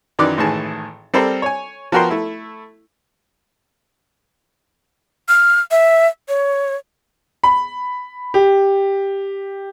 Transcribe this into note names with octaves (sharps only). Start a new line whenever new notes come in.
F#2 D#3 E3 D5 D6 F#6
G#1 A2 D#3 E3 G#4 A5
G3 C4 A4 A#4 C5
C#5 G#5
F3 B3 F#4 A#4 G5 C6
A3 E4
F6
E5
C#5
B5
G4